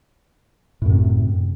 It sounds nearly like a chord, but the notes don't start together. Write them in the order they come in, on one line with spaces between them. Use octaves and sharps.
A2 F#2 C3